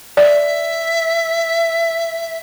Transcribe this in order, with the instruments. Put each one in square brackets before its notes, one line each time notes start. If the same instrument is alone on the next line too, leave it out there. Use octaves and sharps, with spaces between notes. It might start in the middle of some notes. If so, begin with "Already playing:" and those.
[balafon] D5 [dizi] E5